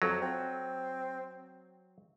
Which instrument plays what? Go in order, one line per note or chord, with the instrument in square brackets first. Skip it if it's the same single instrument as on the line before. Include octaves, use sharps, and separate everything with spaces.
[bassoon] F2 [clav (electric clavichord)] F#3
[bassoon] C4